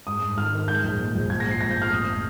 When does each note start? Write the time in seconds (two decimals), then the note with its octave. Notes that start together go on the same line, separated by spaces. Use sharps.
0.06 G#2 D#6
0.22 G#2
0.38 D#3 F6
0.53 D#3
0.68 G#3 G6
0.84 A#1
0.99 G#3
1.15 A#1
1.30 G#2 G#6
1.40 A#6
1.46 F3 C7
1.61 G#2 A#6
1.71 G6
1.76 G#2
1.82 F6
1.92 F1 D#6